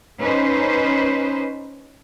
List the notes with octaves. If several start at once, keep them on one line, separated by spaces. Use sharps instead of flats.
C#4 D#4 B4 C5